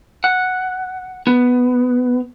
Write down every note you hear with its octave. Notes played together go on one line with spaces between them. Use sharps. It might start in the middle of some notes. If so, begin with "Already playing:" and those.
F#5
B3